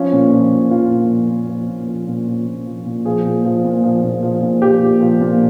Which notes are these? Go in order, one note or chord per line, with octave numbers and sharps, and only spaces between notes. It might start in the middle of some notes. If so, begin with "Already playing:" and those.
Already playing: F3 C#4
A#2
F3
A#2
F3 F4
A#2
F3
A#2
F3
A#2
F3
A#2
F3
A#2
F3
A#2
F3 G#4
A#2
F3
A#2
F3
A#2
F3
A#2
F3 G4
A#2
F3
A#2